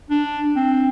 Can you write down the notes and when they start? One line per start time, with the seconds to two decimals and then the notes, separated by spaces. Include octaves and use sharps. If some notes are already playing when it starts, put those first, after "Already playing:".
0.10 D4
0.56 C4